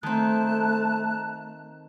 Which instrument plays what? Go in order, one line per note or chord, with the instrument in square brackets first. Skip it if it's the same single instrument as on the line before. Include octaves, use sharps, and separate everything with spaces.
[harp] D#3 C4 [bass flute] A3 [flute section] A5 A#5 F#6